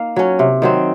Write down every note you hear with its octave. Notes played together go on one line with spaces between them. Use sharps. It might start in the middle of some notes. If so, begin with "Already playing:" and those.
Already playing: A#3 D#4 F5
F#3 C#4
C3
D#3 F#3 C4